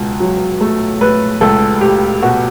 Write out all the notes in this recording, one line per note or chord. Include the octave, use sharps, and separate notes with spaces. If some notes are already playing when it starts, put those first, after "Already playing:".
Already playing: C#2 B2
F#3
A3
A3 B4
C#2 A4
A3 G4
B2 F#4